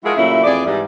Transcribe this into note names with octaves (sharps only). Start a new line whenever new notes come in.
F3 G#3 E4 F#4 G#4 A#4
A#2 C#3 F#3 A3 E4
F2 E3 A3 G#4 D5
G#2 E3 G3